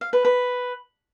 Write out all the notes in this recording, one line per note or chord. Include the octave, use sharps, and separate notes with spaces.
F5
B4
B4